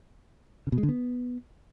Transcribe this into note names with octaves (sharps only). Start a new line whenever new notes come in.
C#3
B2
G#3
D3
B3